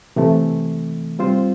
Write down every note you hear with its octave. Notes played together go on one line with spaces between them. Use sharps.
C3 E3 A3
G3 C4 F4 C5